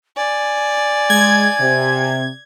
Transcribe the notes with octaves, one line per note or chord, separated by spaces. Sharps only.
D5 G#5
G#3 G#6
C3